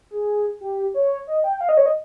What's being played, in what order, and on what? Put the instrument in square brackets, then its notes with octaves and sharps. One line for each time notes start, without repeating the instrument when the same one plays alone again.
[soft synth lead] G#4
G4
C#5
D#5
G5
G5
F5
D#5
C#5
D#5